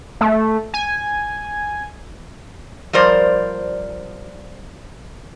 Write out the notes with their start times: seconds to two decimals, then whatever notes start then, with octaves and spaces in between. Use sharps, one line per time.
0.21 A3
0.74 G#5
2.93 F3 G3 A#4 C5 D5